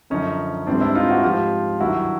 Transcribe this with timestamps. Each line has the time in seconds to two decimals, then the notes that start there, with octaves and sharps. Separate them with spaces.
0.10 F#2 D3 F3 C#4 D#4
0.67 G#2 E3 G3 C4 D4
0.81 D4 E4
0.95 D#4 F4
1.10 E4 F#4
1.24 G#2 F3 F4 G4
1.80 G2 D#3 F#3 E4 F#4